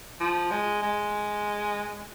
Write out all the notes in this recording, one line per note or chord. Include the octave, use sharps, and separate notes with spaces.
F3
G#3
G#3